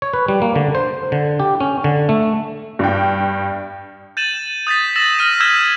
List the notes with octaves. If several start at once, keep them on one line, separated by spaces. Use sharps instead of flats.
C#5
B4
G3
A#3
D3
C5
D3
G4
C#4
D3
A3
G2 G5
G6 A6 D#7 E7 F#7
D#6 G6 A6 B6
E6 A6 A#6 E7 F#7
F6 A#6 B6 D#7
E6 F6 G6 G#6 B6 E7